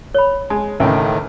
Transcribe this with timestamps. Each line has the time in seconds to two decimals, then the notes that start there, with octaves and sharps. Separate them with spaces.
0.15 C#5 B5
0.50 G#3 A5
0.80 C#2 A2 D#3 E3 G5